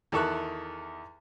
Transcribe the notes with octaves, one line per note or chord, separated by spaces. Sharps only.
E2 D#3 A4 E5 C#6 F#6